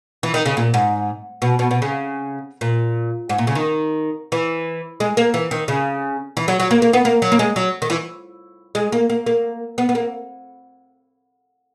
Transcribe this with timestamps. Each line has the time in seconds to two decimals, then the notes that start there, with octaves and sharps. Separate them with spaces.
0.23 E3
0.34 D#3
0.46 C#3
0.57 A#2
0.74 G#2
1.42 B2
1.59 B2
1.71 B2
1.82 C#3
2.61 A#2
3.29 G#2
3.38 A#2
3.47 C#3
3.55 D#3
4.32 E3
5.00 G#3
5.17 A#3
5.34 E3
5.51 D#3
5.68 C#3
6.37 E3
6.48 F#3
6.60 F#3
6.71 A#3
6.82 A#3
6.93 B3
7.05 A#3
7.22 F#3
7.32 A#3
7.39 G#3
7.56 F#3
7.82 D#3
7.90 E3
8.75 G#3
8.92 A#3
9.10 A#3
9.26 A#3
9.78 B3
9.89 B3
9.95 A#3